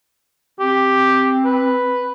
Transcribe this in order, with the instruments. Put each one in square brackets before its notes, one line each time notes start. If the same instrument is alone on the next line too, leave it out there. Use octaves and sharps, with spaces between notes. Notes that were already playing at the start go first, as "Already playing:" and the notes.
[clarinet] C4 [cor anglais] G4
[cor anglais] B4